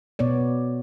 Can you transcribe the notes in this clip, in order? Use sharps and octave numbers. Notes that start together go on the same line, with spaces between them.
B2 B3 C#5 D5